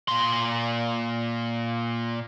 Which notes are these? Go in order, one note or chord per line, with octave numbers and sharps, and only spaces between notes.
A#2 C6